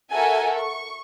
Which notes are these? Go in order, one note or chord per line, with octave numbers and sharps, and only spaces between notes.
F#4 A4 A#4 E5 F#5 G#5
C#6